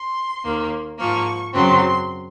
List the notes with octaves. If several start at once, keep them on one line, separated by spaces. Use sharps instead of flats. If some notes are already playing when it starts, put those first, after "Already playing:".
Already playing: C6
D#2 D#3 A#3
G#2 F3 A#3 C#6
F#2 C#3 F#3 C4 C6